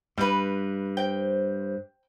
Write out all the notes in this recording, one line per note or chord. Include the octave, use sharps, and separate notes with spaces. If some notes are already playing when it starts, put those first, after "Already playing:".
G2 G3 B4
C5 G5